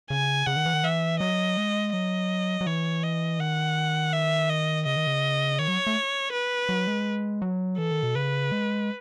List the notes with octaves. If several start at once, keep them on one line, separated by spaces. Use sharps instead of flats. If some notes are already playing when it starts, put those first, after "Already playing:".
C#3 G#5
C#3 F#5
D#3
E3
D#3
E3 E5
F#3 D#5
G#3
F#3 D#5
F#3
E3 C#5
D#5
D#3 F#5
E5
D#5
C#3 D#5
D#3
C#3
D#3 C#5
F#3
A3
B4
F#3
G#3
F#3
E3 A4
D#3
B2
C#3 B4
G#3